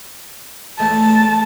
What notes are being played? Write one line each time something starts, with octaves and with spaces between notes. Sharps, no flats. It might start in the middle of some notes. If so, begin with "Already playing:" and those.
E2 A3 A5